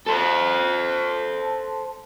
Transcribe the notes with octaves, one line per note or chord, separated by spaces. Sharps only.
A4 C5